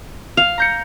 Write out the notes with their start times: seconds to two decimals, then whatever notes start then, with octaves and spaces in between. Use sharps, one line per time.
0.37 F5
0.58 A#5 G6 C#7